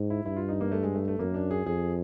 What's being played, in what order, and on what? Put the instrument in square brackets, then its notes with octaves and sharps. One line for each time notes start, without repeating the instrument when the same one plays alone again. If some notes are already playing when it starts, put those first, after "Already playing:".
Already playing: [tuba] G#2
[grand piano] E4
[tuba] G2 [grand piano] E4
[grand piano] F4
D#4
A#3
A3
G#3
A3
A3
[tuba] F#2 [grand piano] A#3
[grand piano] D4
G#4
[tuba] F2 [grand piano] G#4